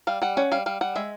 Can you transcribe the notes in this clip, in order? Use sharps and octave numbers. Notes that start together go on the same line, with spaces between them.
G3 F5
G3 F#5
C#4 F#5
G3 F5
G3 F5
G3 F#5
G#3 E5